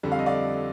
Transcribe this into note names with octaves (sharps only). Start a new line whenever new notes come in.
F2 D3 G3
F5
D#5
D5 F5